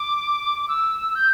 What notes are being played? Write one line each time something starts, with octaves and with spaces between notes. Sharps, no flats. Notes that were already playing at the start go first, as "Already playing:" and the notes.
Already playing: D6
D6
E6
G6